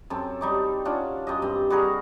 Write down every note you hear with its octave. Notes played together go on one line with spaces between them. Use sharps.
F#2 C4 A4
G3 D#4 D6
C#4 D4 F4 F#4
F#2 G4 D#5
G2 C4
G3 F#4 G#4 A#4